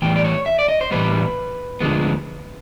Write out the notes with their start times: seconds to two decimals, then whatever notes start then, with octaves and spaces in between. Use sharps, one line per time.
0.02 A2 E3 G3 B3 G5
0.16 D5
0.24 C#5
0.46 E5
0.59 D5
0.68 D#5
0.81 C5
0.91 A2 E3 G3 B3 B4
1.80 D2 D3 F3 G#3 B3